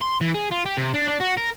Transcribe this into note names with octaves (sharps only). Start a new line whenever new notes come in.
C6
E3
G#4
F4
G4
C3
D4
D4
F#4
A#4